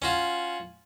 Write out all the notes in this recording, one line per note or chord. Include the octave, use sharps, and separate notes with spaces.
C#4 F4 F#4